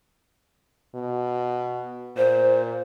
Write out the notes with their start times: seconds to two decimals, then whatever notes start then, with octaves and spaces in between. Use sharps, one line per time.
0.95 B2
2.17 A#2 C5